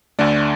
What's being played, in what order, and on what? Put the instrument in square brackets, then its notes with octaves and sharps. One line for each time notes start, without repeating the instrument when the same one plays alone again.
[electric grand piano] D2 D3 A3 D5